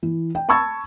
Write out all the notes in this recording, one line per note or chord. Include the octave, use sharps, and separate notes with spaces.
E3
G5
A5 B5 C#6 E6 G#6 A6